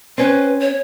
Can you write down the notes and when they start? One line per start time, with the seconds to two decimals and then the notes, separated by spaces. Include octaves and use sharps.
0.18 C4 C#4 B4
0.61 C#5